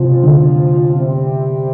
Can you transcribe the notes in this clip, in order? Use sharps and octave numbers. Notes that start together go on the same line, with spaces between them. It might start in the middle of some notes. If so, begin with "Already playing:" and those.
Already playing: C3 F3 C4 F4 C5
D3
C3 G3 C4